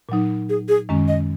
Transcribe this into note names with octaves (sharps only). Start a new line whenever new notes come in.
A#2 F#3 D#4
G#4
G#4
F#2 D#3 G#3 C#4
D#5